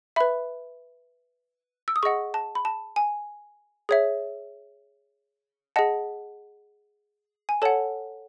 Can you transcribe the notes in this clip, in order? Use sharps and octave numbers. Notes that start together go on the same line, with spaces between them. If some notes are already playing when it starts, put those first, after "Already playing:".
B4 E5 B5
E6
D#6
G#4 D#5 F#5 C#6
A5
B5
A5
G#5
G#4 C#5 E5
G#4 D#5 F#5 A5
G#5
A4 C#5 F#5 A5